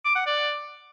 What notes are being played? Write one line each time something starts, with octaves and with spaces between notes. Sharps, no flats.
D6
F#5
D5